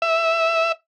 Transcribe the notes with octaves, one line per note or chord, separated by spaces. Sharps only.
E5